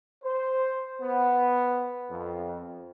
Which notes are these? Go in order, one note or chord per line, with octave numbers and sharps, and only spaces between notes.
C5
B3
F2